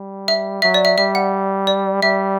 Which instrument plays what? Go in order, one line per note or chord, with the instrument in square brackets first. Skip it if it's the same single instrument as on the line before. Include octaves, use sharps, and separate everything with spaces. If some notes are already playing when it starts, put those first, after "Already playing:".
Already playing: [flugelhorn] G3
[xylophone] E5
[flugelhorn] F#3 [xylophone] E5
[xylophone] D5
E5
[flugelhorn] G3 [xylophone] E5
[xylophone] F#5
D5
[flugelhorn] G3 [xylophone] E5